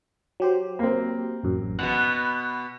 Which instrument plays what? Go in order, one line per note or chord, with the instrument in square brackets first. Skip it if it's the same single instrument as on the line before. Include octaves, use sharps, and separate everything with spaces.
[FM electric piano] F#3 G4 C5
[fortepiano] A#3 C4
[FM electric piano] A1 F#2
[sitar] B2 B3 [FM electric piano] F#6